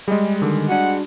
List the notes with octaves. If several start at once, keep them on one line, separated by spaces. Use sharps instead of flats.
G3 G#3 G#4 D#5
D3 D#3
D4 F#4 F#5